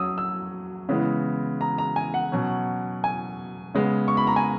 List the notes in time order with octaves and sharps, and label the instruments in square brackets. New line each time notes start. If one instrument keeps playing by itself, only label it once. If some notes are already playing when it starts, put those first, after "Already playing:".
Already playing: [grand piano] F#3 C#4 D#6 E6
E6
C#3 E3 G#3 B3
A#5
A#5
G#5
F#5
B2 F#3 C#4
G#5
C#3 G#3 B3
C#6
B5
A#5
G#5